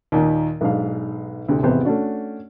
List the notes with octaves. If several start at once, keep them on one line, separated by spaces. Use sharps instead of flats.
D#2 A#2 D#3
B1 G#2 D4 F5
D2 A2 C3
G#1 E2 C3 B3 C4 C5
A3 C#4 D4 F#4